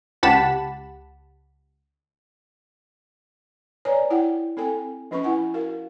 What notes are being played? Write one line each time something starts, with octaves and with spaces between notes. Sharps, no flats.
C#2 G4 F#5 A5 B5 E7
B4 C#5 D5 G#5 A#5
E4 F#5 G5
C4 A4 G5 G#5
F3 C#4 B4 B5 C#6
E4 F#5 G#5
F#4 A#4 F5